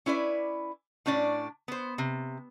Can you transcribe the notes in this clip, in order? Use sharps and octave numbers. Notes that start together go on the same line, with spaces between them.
C#4 E4 B4 D5
A2 C#4 D4 D5
B3 C5
C3